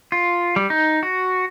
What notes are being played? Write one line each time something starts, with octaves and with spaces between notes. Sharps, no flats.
F4
G3
D#4
F#4